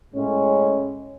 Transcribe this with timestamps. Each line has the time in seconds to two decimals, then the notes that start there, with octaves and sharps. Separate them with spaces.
0.12 A2 G#3 C#4